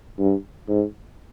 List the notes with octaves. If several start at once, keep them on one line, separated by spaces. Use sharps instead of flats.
G2
G#2